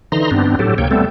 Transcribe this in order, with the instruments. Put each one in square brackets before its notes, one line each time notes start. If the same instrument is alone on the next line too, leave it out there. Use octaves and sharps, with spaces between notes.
[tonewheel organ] D3 E3 D#4 A#5 C6
G2 B3 C4 D4
A2 F#3 G4 A4
D2 C3 A#3 C#5 G5
G3 A3 B3 C4 A4